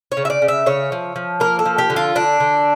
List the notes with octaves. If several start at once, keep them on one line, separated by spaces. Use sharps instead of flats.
C#5
C#3
E5
D5
C#3
E5
C#3 C#5
F3
F3
A#3 A#4
A4
F3
G4
D3
F4
D3 D4
D3